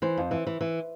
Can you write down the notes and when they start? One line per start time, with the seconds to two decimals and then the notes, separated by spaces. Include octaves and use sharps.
0.02 E3 C5
0.17 F2
0.31 E3
0.47 E3
0.61 E3